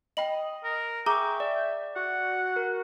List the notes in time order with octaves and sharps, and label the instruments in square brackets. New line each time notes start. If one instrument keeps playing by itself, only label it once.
[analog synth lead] D#5 [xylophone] G5 B5 F#7
[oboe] A#4
[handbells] G#4 C#6 [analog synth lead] E5 [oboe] G5 [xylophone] A#5 D6
[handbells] D5
[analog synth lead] F#4 [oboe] F#5
[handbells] A#4